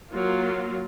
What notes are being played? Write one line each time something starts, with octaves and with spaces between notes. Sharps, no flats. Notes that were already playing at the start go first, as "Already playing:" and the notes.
F#3 A#3 F4